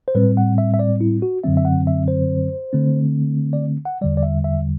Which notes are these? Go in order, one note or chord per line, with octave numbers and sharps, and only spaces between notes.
C5
A2 G3 C4 B4
F#5
E5
E5
D5
E4
F#4
F#2 D3 F#3 C4 E5
E5
F#5
E5
C5
D3 A3 C4
D5
F#5
E2 D3 G3 D5
D5
E5
E5